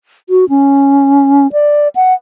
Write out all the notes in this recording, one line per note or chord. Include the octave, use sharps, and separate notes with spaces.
F#4
C#4
D5
F#5